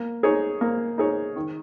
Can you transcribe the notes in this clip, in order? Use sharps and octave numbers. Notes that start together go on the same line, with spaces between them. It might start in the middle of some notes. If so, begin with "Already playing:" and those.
Already playing: A#3
D#4 G#4 C#5
A#3
D#4 G#4 C#5
D#3